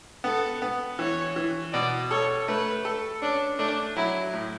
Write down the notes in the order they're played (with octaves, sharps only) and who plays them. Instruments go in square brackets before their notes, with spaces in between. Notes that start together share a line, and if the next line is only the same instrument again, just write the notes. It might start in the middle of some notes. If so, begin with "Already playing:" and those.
[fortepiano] B3 [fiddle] A4
[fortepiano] B3
[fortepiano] E3 [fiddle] C#5
[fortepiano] E3
[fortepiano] B2 [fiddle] D5
[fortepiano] A4 [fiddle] C#5
[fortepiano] A3 [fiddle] B4
[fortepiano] A4
[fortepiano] C#4 [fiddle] D4
[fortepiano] A3 [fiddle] D4
[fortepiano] F#3 [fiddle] E4
[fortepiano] A2